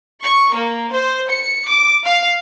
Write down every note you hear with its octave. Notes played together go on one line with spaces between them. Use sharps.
C#6
A#3
C5
C#7
D6
F5